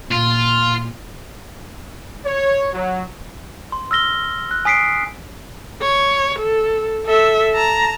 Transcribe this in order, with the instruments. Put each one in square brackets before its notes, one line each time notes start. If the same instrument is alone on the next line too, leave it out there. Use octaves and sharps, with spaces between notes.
[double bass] A#2 [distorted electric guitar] F4
[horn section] C#5
F#3
[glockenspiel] C6
E6 F6 A#6 G7
F#6
G#5 D#6 B6 C7 D7
[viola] C#5
A4
A4 E5
A5 A#5